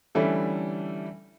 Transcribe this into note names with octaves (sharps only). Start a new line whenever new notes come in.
D3 E3 G3 A3 C#4 E4